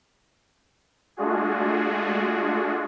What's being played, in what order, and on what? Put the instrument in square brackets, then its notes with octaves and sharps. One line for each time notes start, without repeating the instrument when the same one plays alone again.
[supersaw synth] G#3 A3 D4 F4 F#4 G#4